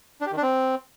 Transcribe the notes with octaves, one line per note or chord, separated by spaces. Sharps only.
D4
G4
D#3
D4
C4